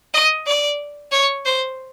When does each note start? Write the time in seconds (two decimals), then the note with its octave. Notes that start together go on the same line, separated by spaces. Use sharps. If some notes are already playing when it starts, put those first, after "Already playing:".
0.14 D#5
0.46 D5
1.12 C#5
1.45 C5